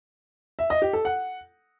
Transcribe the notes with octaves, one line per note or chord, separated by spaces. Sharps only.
E5
D#5
G4
A4
F#5